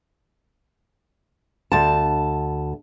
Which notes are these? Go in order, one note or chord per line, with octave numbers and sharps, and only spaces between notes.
D2 A5